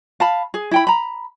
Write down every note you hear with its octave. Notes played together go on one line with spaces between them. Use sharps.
F5 A5 B5
G#4
E4 G5 B5
A#5 B5